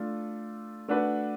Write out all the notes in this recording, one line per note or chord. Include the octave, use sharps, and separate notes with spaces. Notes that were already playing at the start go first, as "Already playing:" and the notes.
Already playing: A3 D4 F4
A3 D4 F#4 B4